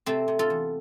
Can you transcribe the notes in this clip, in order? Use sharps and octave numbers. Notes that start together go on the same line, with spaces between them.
C3 A3 C4
C3
F4 A4
E2